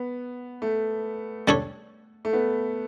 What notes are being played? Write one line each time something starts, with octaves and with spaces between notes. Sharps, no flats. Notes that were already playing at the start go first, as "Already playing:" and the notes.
Already playing: B3
A3
G3 D4 A4 C#5
A3
B3